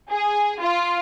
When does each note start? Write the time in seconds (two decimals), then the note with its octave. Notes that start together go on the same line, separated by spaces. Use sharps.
0.10 G#4
0.61 F4